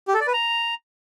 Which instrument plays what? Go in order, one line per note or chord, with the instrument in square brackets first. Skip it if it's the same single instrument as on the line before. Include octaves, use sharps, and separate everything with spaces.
[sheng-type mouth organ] G4
A4
D5
B4
A#5